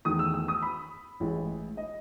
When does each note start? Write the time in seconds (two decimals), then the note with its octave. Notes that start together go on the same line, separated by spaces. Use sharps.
0.05 E2 D#3 A3 D#6
0.19 E6
0.34 E6
0.48 D#6
0.62 B5
1.20 A1 A2 G#3
1.77 D#5